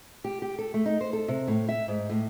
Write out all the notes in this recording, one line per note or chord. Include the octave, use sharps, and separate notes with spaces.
G4
G4
A4
A3
D#4
C5
A4
C3
A2
E5
G#2
A2